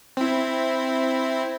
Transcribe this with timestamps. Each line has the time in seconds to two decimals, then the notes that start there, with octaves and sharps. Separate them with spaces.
0.17 C4 E4